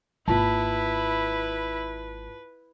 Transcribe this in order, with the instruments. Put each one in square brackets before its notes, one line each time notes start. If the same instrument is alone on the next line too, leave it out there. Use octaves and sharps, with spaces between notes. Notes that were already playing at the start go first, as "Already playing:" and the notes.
[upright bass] G#1 A#3 [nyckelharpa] E4 [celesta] F4 A5 [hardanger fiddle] B4